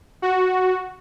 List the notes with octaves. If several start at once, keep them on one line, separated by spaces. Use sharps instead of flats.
F#4